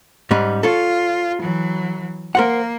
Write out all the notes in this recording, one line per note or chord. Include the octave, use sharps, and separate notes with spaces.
G#2 G3 C#4
F4 A4 C#5
E3 F#3
A#3 A#4 C5 F#5